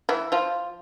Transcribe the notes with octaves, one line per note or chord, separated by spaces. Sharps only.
E3 E4
F3 F4